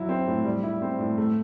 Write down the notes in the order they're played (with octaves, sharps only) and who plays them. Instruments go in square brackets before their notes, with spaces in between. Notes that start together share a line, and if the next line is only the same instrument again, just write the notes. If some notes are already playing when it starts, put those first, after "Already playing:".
Already playing: [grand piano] F#3 E4
C4
A2
G3
E4
C4
A2
A3